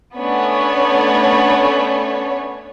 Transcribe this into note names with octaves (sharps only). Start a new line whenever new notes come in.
A3 B3 C#4 D4 C#5